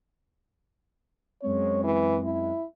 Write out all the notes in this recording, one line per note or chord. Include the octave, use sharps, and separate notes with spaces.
F#2 G#3 C4 C#5
E3
E4